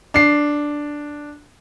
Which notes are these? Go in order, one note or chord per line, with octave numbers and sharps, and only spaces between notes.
D4 C7